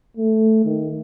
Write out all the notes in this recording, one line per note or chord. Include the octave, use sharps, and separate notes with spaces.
A3
D#3